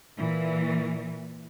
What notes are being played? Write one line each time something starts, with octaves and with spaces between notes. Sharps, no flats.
A#2 E3